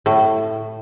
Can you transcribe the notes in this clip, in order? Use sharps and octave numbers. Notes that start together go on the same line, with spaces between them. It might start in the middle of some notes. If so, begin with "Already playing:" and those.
A2